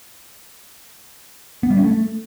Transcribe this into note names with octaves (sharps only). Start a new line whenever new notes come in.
B3
G3
C#4
A3